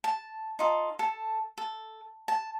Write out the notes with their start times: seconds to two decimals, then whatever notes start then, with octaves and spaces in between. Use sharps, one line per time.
0.04 A5
0.59 D#4 F4 A4
0.99 A4 A5
1.58 A4
2.28 A5